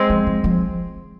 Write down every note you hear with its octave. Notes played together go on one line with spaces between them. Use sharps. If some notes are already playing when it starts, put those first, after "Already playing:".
Already playing: G#3 C4
F3
F3
F3